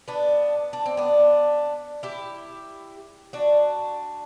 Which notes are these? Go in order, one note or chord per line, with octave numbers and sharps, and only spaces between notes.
B3 D4
D4
C4
B3 D4
E4 G4
D4 F#4